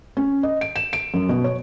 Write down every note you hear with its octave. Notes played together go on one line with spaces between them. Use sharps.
C#4
D#5
D7
E7
D7
F#2
B2
C#5